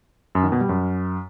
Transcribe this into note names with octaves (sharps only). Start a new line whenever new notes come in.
F#2
D#3
B2
G3
F#2